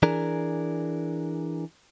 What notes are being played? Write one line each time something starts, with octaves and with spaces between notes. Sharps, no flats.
E3 D4 G#4 A#4